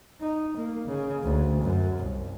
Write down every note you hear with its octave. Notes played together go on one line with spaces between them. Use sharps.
D#4
A#3
C#3
D2
F#2
C2